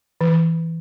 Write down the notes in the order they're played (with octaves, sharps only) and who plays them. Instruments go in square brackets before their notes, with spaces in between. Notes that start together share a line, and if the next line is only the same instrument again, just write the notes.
[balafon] E3